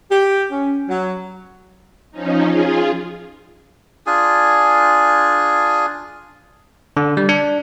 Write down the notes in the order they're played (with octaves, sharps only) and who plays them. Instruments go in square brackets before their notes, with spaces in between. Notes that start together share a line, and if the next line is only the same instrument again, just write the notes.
[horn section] G4
C#4
F#3
[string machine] F3 C#4 D#4
F4 G#4
[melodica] D4 F4 G#4 G#5
[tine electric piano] D3
G3
D4